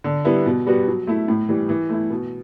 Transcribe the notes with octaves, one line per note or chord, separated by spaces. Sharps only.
D3
G3 B3 E4
B2
G3 B3 F#4
F#3
A3 E4
A2
E3 G3
E3
A3 E4
B2